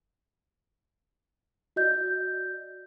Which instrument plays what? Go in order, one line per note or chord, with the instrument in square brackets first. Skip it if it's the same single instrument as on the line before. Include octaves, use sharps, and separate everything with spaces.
[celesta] F#4 D5 D#5 G6